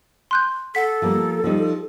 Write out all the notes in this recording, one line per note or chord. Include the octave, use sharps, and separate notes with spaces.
C6 F#6 G6
A4 F#5 B6
F3 G3 A#3
F3 G3 D#4